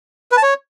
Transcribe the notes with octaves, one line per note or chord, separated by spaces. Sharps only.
B4
A5
C#5